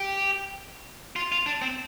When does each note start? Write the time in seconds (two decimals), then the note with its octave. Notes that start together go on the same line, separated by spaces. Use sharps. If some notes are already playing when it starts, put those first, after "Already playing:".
Already playing: G4
1.16 F4
1.32 F4
1.46 D4
1.62 C4